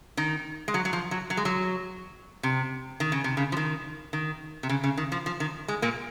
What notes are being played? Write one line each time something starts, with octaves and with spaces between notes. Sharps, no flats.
D#3 D#4
G#3
F#3
F#3
F3
F#3
F#3
G#3
F#3
C3
D#3
C#3
C3
C#3
F3
D#3
D#3
C3
C#3
C#3
D#3
F3
F3
D#3
G#3
A#2 A#3